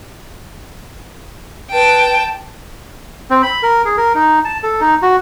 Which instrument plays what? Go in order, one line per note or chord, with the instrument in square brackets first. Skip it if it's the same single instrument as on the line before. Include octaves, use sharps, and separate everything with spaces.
[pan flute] B4 [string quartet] G5 A5
[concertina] C4
B5
A#4
G#4
A#4
D#4
A5
A4
D#4
F#4